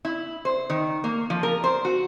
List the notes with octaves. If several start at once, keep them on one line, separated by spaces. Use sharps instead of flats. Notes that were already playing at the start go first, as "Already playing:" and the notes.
E4
C5
D#3
A#3
F3
A#4
C5
F#4